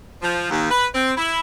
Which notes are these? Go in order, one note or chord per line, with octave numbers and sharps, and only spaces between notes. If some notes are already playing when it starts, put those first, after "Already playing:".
F3
D#2
B4
C4
E4